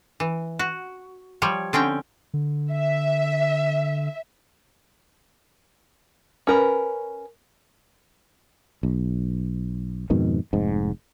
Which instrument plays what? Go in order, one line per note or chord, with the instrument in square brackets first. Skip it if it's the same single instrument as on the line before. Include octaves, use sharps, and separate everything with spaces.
[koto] E3
F#4
F3 G3 C#5
D3 C4 C#4 G5
[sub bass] D3
[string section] E5
[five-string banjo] C#4 A#4 B4
[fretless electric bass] B1
F2 G#2 B2 D#3
F1 G#2